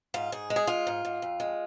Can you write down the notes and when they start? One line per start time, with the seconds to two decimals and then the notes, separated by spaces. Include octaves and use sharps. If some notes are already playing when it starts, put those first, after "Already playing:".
0.14 G#2 F4
0.32 G#2 G#4
0.50 G#3
0.56 G#4
0.67 G#3 F4
0.87 G#2
1.05 G#2
1.22 F2
1.40 G#3